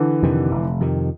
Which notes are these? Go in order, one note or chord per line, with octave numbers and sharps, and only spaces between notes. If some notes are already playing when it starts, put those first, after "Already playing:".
Already playing: D3 E3
F2 C3 D#3
F1
F2 C3 D#3